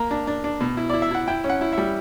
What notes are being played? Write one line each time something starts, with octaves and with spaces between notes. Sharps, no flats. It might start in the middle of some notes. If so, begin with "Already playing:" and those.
Already playing: A#3 A#5
D4
D4
D4
B2
E4
E4 D5
E5
E4 F#5
E4 G5
C#4
F#5
E4
G3 E5